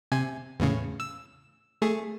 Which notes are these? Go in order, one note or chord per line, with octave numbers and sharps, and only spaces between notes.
C3 G#5
E2 A2 C#3
E6
A3 G#4